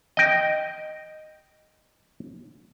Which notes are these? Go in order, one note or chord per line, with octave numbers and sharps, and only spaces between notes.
D#5 G5